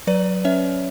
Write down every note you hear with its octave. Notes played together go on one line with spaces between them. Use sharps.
F#3 B4 D5
C#4 C#5 E5